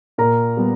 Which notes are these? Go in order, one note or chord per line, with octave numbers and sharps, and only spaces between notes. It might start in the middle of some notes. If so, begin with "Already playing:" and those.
A#2 A#4 A#5
G3 B3